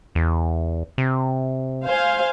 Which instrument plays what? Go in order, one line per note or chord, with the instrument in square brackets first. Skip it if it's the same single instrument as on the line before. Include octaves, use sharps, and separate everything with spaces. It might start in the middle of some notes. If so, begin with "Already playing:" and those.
[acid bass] E2
C3
[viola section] C5 F5 G#5